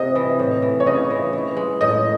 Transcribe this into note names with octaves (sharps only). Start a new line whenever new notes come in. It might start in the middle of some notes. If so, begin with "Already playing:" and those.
Already playing: C3 D#5
E3
A2
E3
C#5
C#3 D#5
E3
E3
G#3
A2 D#5